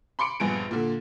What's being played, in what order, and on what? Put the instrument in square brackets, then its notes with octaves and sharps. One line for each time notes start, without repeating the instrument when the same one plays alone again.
[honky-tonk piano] B5 C6 D6 C#7 D7
A#1 G2 B3 G#4 D7
A#2 D3